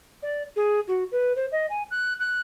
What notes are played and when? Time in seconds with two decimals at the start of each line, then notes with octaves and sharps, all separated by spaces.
0.23 D5
0.56 G#4
0.88 F#4
1.12 B4
1.36 C5
1.52 D#5
1.70 G#5
1.91 F#6
2.20 F#6